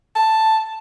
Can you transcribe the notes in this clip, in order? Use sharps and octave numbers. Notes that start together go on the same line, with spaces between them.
A5